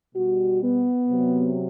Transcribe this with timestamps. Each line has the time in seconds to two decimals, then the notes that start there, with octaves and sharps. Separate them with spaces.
0.15 B2 G3 F#4
0.61 B3
1.07 C3 F#3